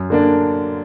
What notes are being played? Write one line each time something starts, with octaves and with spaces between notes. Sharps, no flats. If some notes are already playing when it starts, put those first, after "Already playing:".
Already playing: F#2
D3 A#3 D4